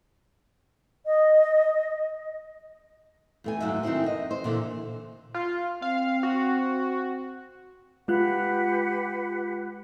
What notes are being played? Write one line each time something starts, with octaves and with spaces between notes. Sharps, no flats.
D#5
E2 A3 G#5
D#2 G#2 F#3 E5
D#3 C4 D#4 E4 C5
E2 D#5
C5
A#2 D3 E3
F4
C4 F5
F#4
G#3 F4 G4 B4 F#5 F#6